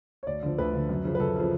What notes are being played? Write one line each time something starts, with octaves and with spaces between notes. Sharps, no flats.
C#5
D2 D5
D3 F3
D2 B4
D3 F3
F#2
C#3 F3
B4
F#2 A4
C#3 F3